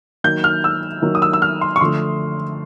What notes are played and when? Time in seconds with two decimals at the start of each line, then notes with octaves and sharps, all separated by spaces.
0.24 D#3 F#3 A#3 G6
0.44 F6
0.64 E6
1.02 D#3 F#3 A#3
1.15 D#6
1.22 E6
1.33 E6
1.42 F6
1.61 C6
1.76 C#6
1.81 D3 F3 A3 C6